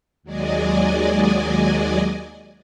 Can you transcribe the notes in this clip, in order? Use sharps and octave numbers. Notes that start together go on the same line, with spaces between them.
D#2 F#3 G#3 D5 D#5 G#5